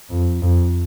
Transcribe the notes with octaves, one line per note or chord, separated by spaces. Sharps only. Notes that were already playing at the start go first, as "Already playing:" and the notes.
F2
F2